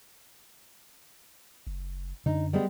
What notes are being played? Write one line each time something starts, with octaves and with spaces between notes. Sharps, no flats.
F#1
F#2 D3 D#4
G3 G#3 B3